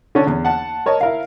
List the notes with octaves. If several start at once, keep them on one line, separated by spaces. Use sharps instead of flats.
D3 C#4 D4
E2
F#5 A5
A#4 C#5 D#5 A5
E4 A#4 F5